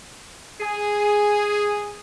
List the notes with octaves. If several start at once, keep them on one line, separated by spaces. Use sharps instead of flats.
G#4